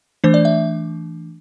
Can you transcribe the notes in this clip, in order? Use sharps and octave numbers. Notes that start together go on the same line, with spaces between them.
E3 A3 D4 C5
D5
E5